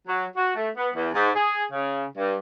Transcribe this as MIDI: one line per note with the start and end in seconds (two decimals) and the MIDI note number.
0.08 0.26 54
0.36 0.54 66
0.55 0.68 57
0.75 0.89 59
0.95 1.09 40
1.13 1.30 44
1.35 1.64 68
1.72 2.05 49
2.17 2.35 43